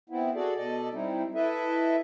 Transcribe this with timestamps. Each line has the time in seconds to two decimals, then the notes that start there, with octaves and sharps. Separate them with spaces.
0.10 B3 C4 E4
0.35 F#4 G#4 A4 D5
0.56 B2 A4 D5 D#5
0.93 G3 C4 D#4 E4
1.35 E4 A4 B4 D#5 E5